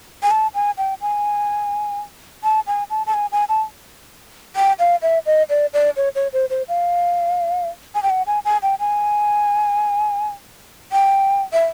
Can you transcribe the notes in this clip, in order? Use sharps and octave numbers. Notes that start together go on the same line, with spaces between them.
G#5
A5
G#5
G5
G#5
A5
G#5
A5
A5
G#5
G#5
A5
G5
F5
E5
D#5
D5
D5
C#5
C#5
C5
C5
F5
G#5
G5
F#5
G#5
G#5
G5
G#5
G5
E5